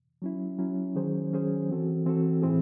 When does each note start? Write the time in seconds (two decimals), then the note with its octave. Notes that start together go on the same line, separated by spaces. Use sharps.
0.22 F#3 C#4 E4
0.59 F#3 C#4 E4
0.95 D#3 F#3 C#4 G#4 C5
1.32 D#3 F#3 C#4 G#4 C5
1.69 E3 C4 F#4 A4
2.06 E3 C4 F#4 A4
2.42 A2 E3 C4 E4 G#4